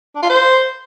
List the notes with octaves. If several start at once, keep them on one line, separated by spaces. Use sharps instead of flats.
D4
F4
C5